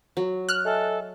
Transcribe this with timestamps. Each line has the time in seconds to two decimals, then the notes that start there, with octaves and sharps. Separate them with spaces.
0.17 F#3
0.49 F6 F#6
0.65 A4 D#5 E5 G#5